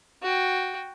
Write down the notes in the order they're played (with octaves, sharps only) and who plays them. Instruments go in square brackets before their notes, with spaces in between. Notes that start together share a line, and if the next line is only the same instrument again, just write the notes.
[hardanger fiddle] F#4 G5